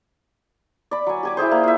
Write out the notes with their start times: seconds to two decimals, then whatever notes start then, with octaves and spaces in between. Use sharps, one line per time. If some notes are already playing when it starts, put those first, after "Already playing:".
0.91 D5 B5
1.06 F#3 G#5
1.23 G4 G#5 D6
1.37 E4 G4 G#4 C5
1.51 A#3
1.64 F4 E5